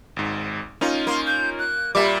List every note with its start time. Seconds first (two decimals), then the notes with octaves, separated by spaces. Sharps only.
0.16 G#1 G#2
0.81 A#3 C#4 D#4 F4
1.07 A#3 C6
1.27 G6
1.59 F#6
1.95 A#2 G3 E5 B5 D6